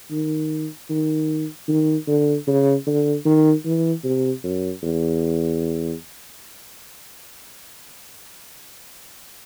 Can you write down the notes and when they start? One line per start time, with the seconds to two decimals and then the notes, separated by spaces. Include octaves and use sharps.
0.11 D#3
0.90 D#3
1.68 D#3
2.07 D3
2.47 C#3
2.87 D3
3.25 D#3
3.65 E3
4.04 C3
4.44 F#2
4.83 E2